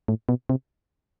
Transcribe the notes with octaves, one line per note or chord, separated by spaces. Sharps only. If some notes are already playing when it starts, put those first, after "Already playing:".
A2
B2
C3